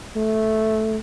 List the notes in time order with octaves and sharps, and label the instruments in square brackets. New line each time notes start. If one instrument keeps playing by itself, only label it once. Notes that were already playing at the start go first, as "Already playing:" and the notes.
[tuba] A3